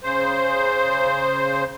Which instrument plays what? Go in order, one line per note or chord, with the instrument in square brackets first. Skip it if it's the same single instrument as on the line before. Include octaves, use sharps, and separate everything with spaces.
[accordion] C#3 C5